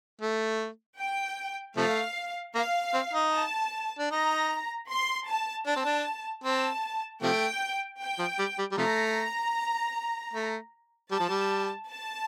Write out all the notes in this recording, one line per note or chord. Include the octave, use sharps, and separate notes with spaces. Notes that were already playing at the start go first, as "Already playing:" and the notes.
A3
G5
C3 F3 A3 F5
A#3 F5
C4
D#4
A5
D4
D#4 A#5
C6
A5
D4 A5
C4
D4
C4 A5
C3 F3 A3 G5
G5
F3
G3
G3
G3
C3 F3 A3 A#5
A3
G3 A5
F3
G3
A5